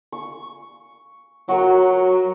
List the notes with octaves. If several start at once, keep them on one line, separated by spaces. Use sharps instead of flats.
C#6
F#3 F#4 A#4